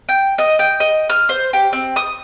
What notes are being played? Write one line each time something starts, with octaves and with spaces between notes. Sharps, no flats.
G5
D#5
G5
D#5
F6
C5
G4
C4
D#6